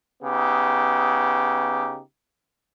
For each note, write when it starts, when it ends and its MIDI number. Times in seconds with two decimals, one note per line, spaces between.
0.23 2.00 49
0.23 2.00 59
0.23 2.00 63
0.23 2.00 67